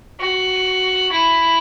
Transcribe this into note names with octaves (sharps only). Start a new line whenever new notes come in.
F#4
E4